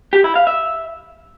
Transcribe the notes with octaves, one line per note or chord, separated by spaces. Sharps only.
G4
E4
F5
E5